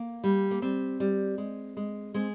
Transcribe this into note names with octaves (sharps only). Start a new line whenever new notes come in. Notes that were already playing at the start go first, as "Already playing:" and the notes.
Already playing: A#3
G3
A#3
G3 C4
G3
G#3
G#3
G#3 C4